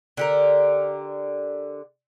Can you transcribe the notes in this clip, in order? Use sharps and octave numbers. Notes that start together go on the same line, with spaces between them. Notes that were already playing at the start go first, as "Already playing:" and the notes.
D3 G4 A#4